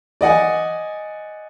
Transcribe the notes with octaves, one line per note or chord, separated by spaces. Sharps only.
D5 D#5 F#5 G#5